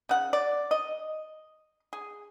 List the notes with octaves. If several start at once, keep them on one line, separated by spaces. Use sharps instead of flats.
C#3 F#5
D5
D#5
G#4